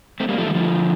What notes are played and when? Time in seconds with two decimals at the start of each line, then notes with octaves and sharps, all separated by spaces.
0.20 A3 C4
0.29 G3 A#3
0.38 F3 A3
0.46 D#3 G3
0.55 D3 F3